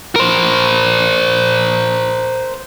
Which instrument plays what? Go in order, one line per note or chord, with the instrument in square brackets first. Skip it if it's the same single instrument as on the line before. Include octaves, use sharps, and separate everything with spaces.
[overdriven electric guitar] A#4 C5